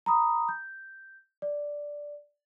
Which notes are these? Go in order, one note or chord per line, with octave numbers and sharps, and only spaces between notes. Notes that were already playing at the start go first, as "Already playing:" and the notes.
A#5 B5 D#6
G6
D5